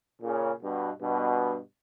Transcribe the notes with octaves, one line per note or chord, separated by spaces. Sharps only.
A#2 C#3
G2 B2
G2 B2